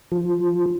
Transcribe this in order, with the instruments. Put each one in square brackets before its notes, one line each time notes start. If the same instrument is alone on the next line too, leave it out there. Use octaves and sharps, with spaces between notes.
[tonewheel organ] F3